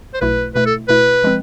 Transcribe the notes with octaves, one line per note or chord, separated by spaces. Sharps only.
C5
B1 B2 A3 E4 B4
B2 A3 E4 B4
A4
B2 A3 E4 B4
F3 G#3 C4